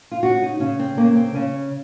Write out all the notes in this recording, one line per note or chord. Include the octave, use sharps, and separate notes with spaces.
F4
C#3 F#4
D#4
C#3 C#4
C4
C#3 A#3
C4
C#3 C#4